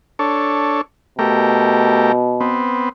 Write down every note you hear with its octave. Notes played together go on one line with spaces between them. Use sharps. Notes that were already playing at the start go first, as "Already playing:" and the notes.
D4 A4 C#5
B2 A3 G4 A#4
B3 C4